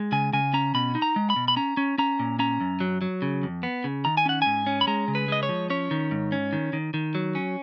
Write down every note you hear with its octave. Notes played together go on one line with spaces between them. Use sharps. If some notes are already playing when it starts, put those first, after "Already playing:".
Already playing: G#3
C#3 G#5
C#3 G#5
C#4 A#5
B2 B5
D#4
A#5
G#3
B5
B2
B5
C#4 A#5
C#4
C#4 A#5
A#2
C#4 A#5
F#2
F#3
F#3
C#3
F2
B3
C#3
D#3 A#5
G#5
C#4 F#5
G#2 G#5
C#4
B5
G#3 A#5
C#3
B4
G#3 D#5
C#5
F3
C#4 C#5
D#3
G#2
C#4
D#3
D#3
D#3
F#3
C#4